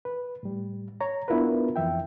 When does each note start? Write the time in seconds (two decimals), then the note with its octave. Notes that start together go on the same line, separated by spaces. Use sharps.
0.05 B4
0.43 A2 G3
1.01 C#5 A#5
1.28 B3 D4 E4 F4 A#4 B4
1.76 F2 E3 E5 G5